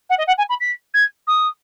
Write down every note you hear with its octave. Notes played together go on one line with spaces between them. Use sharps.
F#5
D#5
F#5
G#5
B5
B6
G#6
D#6